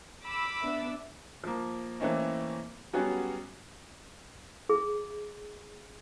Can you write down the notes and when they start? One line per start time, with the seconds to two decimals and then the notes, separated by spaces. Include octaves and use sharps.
0.24 B5 D6 E6
0.63 B3 D4 E5
1.44 F3 A#3
2.00 E3 A3 A#3 C4 C#4 D#4
2.93 F#3 G3 B3 C#4 F#4 G#4
4.69 G#4